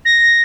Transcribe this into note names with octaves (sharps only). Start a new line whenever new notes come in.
A#6